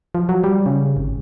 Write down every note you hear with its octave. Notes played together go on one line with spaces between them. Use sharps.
F3
F#3
G3
C#3
G#1